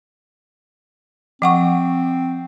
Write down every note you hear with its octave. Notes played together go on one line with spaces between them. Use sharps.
F3 C4 F#5 C#6